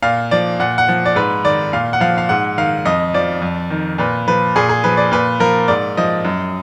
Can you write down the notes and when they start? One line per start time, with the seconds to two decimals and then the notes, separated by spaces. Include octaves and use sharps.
0.03 A#2 F5
0.31 F3 D5
0.59 A#2 F#5
0.78 F#5
0.88 F3
1.06 D5
1.16 G#2 B4
1.45 D#3 D5
1.73 A#2 F5
1.93 F#5
2.00 F3 F5
2.18 F5
2.29 G#2 F#5
2.58 D#3 F5
2.85 F2 D#5
3.14 F3 D5
3.42 F2
3.70 D#3
3.98 A#2 B4
4.27 F3 B4
4.56 A#2 G#4
4.69 G#4
4.84 F3 B4
4.97 D5
5.11 A#2 B4
5.40 F3 A#4
5.68 G#2 D5
5.97 F3 D#5
6.25 F#2